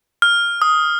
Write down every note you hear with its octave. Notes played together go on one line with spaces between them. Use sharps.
F6
D#6